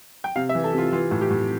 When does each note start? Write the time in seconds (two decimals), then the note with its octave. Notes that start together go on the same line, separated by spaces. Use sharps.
0.24 G5
0.36 C3 F5
0.49 E5
0.55 E3
0.64 A4
0.73 C3 F4
0.92 E3 F4
1.11 A2
1.21 G4
1.30 A2